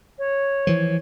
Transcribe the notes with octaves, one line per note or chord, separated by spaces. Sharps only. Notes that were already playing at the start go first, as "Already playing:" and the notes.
C#5
E3 F3